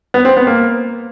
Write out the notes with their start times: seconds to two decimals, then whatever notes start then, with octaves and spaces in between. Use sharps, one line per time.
0.14 B3
0.25 C4
0.37 B3
0.47 A#3